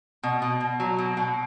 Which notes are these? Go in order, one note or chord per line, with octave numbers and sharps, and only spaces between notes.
B2
B2
B2
F#3
B2
B2